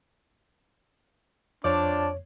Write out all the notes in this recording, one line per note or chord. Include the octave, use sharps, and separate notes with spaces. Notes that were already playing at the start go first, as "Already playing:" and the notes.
F2 F3 D4 C#5 D5 A5